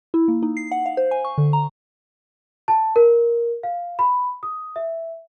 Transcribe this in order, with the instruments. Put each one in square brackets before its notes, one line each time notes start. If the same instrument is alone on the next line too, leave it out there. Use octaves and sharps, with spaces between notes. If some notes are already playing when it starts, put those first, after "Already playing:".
[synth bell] E4
A#3
D#4
C7
F#5
F5
C5
G#5
C#6
D3
A#5
[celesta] A5
A#4
F5
B5
D#6
E5